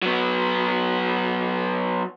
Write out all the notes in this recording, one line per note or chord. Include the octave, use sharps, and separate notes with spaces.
F#3 B3